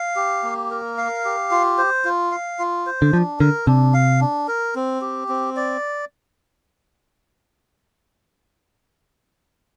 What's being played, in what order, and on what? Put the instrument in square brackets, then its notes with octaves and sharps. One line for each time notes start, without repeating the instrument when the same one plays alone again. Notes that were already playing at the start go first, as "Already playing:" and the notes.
Already playing: [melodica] F5
G4
A#3
A#4
F5
G4
F4
C5
F4
F5
F4
C5
[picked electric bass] D3
[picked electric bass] F3 [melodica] D4
[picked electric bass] D3 [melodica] A#4
[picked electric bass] C3 [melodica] D4
[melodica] F5
D4
A#4
C4
G4
C4
D5